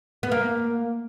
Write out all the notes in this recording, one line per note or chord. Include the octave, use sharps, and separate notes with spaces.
B3
A#3